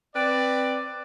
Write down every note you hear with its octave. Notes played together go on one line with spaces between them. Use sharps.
C4 B4 D5